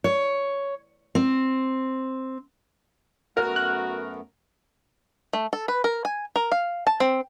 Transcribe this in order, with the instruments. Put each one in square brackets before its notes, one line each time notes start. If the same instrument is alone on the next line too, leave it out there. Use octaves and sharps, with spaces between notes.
[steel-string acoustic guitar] C#5
C4
[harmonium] F#2 A3 B3 [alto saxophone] F#4 [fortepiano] A#4
[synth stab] F#6
[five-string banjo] A3
A4
B4
A#4
G#5
A#4
F5
A5
C4